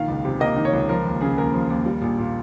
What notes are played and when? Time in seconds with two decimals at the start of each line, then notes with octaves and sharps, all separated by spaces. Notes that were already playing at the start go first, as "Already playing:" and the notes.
Already playing: A#1 D#3 F5
0.08 C#2
0.25 C3
0.40 A#3 D#5
0.56 D#3
0.65 C#5
0.73 C#2
0.89 F3 A#4
1.05 D#2
1.21 C#3 G#4
1.38 D#2 A#4
1.53 F3
1.70 D#2
1.86 G3
2.02 A#1
2.18 A#2